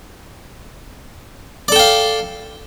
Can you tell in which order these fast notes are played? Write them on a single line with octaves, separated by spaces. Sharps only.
D5 A4 G5 F5